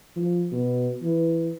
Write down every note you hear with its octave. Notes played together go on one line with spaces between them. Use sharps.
F3
B2
E3